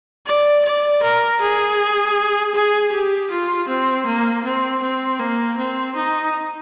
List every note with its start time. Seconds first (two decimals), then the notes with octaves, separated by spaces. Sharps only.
0.26 D5
0.65 D5
1.03 A#4
1.41 G#4
2.54 G#4
2.92 G4
3.30 F4
3.68 C4
4.06 A#3
4.44 C4
4.82 C4
5.19 A#3
5.57 C4
5.96 D#4